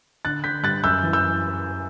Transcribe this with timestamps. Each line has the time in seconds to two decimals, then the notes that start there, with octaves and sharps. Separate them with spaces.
0.25 D3 F#6 A6
0.44 D3 G6 B6
0.63 G2 F#6 A6
0.84 F#2 E6 G6
1.03 E3
1.13 E6 G6